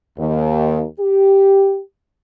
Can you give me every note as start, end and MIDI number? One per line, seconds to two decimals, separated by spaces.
0.18 0.83 39
0.99 1.79 67